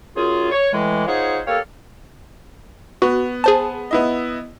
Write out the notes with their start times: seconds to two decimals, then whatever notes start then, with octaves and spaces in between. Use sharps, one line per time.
0.16 F#2 F4 G#4
0.52 C#5
0.74 A2 E3 G#3
1.08 D#4 F4 G#4 C5 C#5 F#5
1.47 A#3 G4 A4 C#5 F5
3.02 B3 F#4
3.44 G#4 C5 A5
3.91 B3 E4 D#5